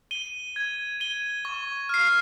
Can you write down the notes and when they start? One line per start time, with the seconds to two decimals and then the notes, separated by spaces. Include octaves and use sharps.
0.11 D#7 G7
0.56 G#6
1.00 D#7 G7
1.45 C#6
1.89 F6 C7